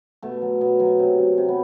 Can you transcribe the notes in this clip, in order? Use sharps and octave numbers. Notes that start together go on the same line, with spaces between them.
B2 A3
F#3
B2
F#3
C3
F#3
C3
B3